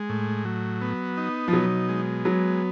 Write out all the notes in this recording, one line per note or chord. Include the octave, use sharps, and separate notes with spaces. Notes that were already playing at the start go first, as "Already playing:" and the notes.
Already playing: G#3
A2
F#3
B3
D#4
F3
B2 F#3
G#3
F#3 B3